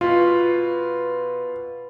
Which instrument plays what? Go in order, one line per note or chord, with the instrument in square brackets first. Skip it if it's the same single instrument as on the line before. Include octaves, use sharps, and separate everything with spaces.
[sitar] B2 [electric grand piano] F4